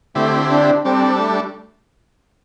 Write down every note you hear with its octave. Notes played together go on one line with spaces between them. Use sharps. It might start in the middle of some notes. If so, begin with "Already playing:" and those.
D3 A3 C4 E4 G4
D4
G3 C4 D4 A4
A3